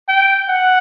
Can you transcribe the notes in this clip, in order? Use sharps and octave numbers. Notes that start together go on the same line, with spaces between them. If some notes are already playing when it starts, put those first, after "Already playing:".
G5
F#5